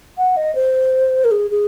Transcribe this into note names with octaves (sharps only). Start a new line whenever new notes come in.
F#5
D#5
C5
A#4
G#4
G#4